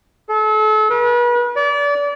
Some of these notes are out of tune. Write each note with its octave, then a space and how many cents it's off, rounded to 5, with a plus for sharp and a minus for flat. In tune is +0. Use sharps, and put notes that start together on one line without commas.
A4 -35
B4 -40
D5 -30